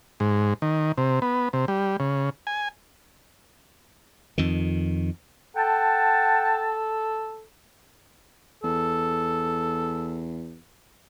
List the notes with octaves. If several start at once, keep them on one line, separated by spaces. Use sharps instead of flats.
G#2
D#3
C3
B3
C3
G3
C#3
G#5
F2 D#3
A4 F#5 G5 A5
E2 A4